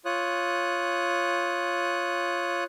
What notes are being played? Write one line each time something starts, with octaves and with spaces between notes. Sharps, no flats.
F4 C#5 D#6 F#6